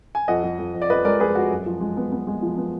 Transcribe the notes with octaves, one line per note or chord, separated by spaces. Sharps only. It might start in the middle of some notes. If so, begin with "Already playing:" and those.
G#5
F2 D#5 F#5
F2
F2
F2
D5
F2 B4 D#5
G#3 A#4 D5
F2 G#4 B4
F2 F#4
F#2
F3
G#3
B3
B3
G#3
F3
B3